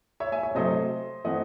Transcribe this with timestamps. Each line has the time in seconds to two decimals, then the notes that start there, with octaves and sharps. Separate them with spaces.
0.20 C#5 E5
0.32 E5 G#5
0.43 C#5 E5
0.55 C3 F#3 A3 C5 D#5
1.25 E3 A3 C4 D#5 F#5